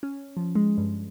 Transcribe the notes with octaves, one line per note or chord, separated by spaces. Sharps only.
C#4
F3
G#3
G2